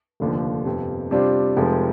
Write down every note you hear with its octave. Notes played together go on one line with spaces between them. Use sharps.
F1 D#2 D3 F3
G1 F2 C3
C3 G3 D4 F4 C5
F1 F2 C3 F3 G#3